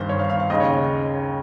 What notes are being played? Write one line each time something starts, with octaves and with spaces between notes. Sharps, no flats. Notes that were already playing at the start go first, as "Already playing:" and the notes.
Already playing: G1 G2 D#3 C5
C#5
F5
F5
F5
D#2 C#3 D#5
C#5
D#5